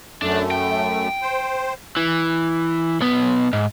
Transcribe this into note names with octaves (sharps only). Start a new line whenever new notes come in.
F#2 A3 D4
G5
C5
E3
B1 B3
G#2